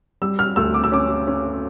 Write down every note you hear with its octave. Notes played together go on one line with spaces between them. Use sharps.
G3 E6
F6
D2 E6
D6
E6
C#4 D6
C#4